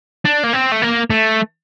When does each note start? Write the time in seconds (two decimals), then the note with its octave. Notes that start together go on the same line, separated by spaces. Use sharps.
0.25 D4
0.43 A#3
0.53 C4
0.72 A3
0.82 A#3
1.10 A3